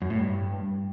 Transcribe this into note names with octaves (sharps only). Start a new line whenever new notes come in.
F#2
A2
G2